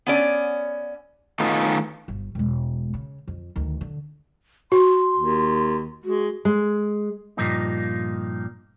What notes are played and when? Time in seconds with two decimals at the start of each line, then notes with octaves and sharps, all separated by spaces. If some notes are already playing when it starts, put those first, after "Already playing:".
0.06 B3 C#4 D5
1.40 D#3 A3 B3 C#4 D#4 F4
2.08 G1
2.35 E1 G#3
2.94 C#3
3.28 F2
3.56 D2 D#3
3.81 D3
4.72 F#4 C6
5.16 D#2
6.04 G#3 F#4
6.45 G#3
7.37 G2 A#2 F3 A#3 D#4